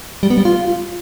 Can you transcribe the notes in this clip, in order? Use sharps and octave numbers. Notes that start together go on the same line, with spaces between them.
G3
B3
G3
F4